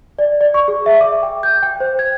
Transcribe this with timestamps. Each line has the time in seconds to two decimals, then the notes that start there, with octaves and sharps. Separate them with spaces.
0.19 D5
0.41 D5
0.54 C#6
0.68 G#4
0.86 E5
1.01 D6
1.23 G5
1.43 G6
1.63 G5
1.80 C5
1.99 G#6